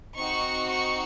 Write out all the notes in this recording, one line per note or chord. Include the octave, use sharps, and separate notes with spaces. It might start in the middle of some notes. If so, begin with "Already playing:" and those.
C4 D#4 F#4 C#6
C#6